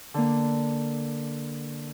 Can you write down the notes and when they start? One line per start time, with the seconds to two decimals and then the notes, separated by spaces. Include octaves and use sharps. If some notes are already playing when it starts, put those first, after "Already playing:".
0.14 D3 A#3